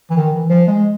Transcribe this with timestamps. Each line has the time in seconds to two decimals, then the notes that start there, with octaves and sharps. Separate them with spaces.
0.10 E3
0.17 D#3
0.33 E3
0.50 F3
0.67 G#3